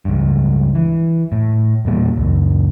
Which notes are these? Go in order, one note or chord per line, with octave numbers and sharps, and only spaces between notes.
C#2 G2
E3
A2
D#1 E2 A#2 G3
C#2 F#2